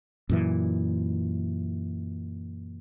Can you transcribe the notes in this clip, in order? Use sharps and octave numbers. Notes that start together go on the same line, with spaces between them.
F#2 A#2 E3